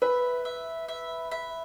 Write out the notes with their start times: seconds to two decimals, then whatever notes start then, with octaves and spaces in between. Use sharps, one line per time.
0.02 B4 E5
0.45 E5
0.88 E5
1.31 E5